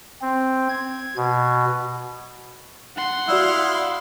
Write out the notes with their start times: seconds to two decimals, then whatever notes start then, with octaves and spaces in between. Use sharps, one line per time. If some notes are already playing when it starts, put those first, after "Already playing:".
0.22 C4
0.69 G#6
1.17 B2
2.96 F#5 C6
3.28 E4 F#4 D5 F5 D#6 E6